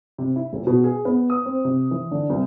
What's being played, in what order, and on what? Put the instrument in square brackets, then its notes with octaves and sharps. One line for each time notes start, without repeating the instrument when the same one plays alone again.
[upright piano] C3
E4
D#1
B2
G#4
B3
D#6
C4
C3
E3
D3
C2